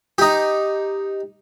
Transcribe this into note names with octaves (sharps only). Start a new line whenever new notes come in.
D#4 G4